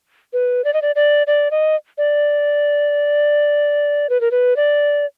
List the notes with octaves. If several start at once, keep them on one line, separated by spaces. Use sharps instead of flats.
B4
D5
D#5
D5
D5
D5
D#5
D5
B4
A#4
B4
D5